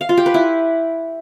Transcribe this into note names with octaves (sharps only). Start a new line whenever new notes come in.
F5
F4
G4
B4
E4